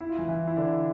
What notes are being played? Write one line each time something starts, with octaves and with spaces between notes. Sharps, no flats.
E4
F4
E3 E4
E3 E4
E4
D3 D4